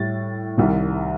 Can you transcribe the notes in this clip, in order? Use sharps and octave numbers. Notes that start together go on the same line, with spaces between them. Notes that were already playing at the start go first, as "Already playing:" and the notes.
Already playing: A2 G3 A6
C2 C3 D#3 G3